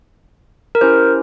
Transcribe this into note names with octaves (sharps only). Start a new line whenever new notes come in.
A#4
C#4 E4 G4 C5